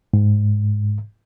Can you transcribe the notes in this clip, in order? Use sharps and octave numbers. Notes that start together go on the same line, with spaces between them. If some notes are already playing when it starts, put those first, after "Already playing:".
G#2